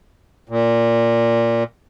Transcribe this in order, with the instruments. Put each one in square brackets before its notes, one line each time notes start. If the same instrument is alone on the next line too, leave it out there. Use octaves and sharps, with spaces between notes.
[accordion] A#2